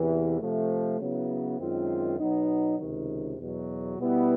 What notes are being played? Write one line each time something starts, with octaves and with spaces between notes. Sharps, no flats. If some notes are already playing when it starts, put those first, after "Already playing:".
Already playing: E2 C3 E3
C3 F3 A3
C#3 F#3 B3 E4
F#2 D#3 G#3 C4 F4
B2 F#3 B3 D#4
C#2 C3 D#3
E2 B2 F#3
B2 G3 B3 E4